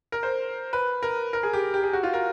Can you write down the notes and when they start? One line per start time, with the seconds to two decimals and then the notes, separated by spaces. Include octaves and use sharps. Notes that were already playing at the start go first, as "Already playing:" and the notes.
0.12 A#4
0.23 C5
0.73 B4
1.03 A#4
1.33 A#4
1.43 G#4
1.53 G4
1.74 G4
1.83 G#4
1.93 F#4
2.03 F4
2.13 A#4